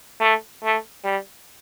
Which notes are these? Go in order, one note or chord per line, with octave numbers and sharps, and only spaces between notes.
A3
A3
G3